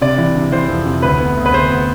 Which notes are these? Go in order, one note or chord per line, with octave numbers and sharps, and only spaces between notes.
C3 D5
E3
C3
E3 C5
F2
C3
D2 B4
B3
D2
B4
D2 C5
B3